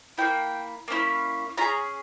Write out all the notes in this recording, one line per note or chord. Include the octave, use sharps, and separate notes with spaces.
A#3 C#4 E4 G5
A#3 C#4 E4
C#4 F4 G#4 A#5